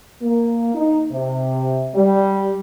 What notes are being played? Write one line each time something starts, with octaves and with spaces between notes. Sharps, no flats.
A#3
D#4
C3
G3